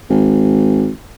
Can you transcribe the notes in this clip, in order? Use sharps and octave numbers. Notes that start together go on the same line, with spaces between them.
G#1